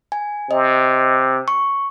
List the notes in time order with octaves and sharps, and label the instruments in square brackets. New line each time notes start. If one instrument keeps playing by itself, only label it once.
[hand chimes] G#5
[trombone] C3 [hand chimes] D#5
[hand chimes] C#6